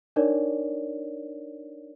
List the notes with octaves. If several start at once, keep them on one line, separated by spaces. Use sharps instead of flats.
D4 D#4 A#4 C#5 D5